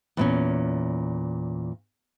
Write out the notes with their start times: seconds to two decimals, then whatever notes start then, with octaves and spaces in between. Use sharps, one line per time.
0.17 E2 A#2 C#4